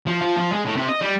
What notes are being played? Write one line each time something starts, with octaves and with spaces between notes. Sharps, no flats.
F3
F3
F3
G#3
A2
C3
D#5
G3